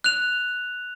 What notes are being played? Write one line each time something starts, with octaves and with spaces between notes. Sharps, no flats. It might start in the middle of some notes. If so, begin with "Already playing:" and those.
F#6 F7